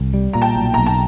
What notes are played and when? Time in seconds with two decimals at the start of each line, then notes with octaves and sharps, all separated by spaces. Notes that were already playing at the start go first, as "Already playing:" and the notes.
Already playing: C2
0.14 G3
0.33 A#2 A#5
0.42 G5 A5
0.56 B1
0.74 B1 A#5
0.86 A5